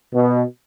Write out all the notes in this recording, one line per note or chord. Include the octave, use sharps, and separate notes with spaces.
B2